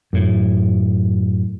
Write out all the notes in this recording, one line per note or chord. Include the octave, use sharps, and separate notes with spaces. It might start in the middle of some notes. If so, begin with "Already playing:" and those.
F#2 A2